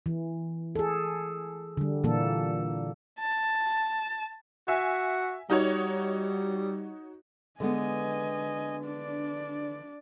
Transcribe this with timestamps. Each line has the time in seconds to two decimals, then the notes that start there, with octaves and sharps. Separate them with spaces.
0.06 E3
0.75 G#4 A4
1.77 D3 G3
2.04 A#2 E3 A#3 A4
3.19 A5
4.68 F#4 E5 G#5
5.50 G3 D#4 F#4 C#5
7.60 D3 G#3 B3 D#5 G#5
8.84 D4 D5